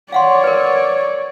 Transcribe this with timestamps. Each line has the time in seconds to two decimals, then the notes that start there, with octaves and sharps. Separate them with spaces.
0.12 C#5 D5 F5 F#5 C6
0.44 A#4 B4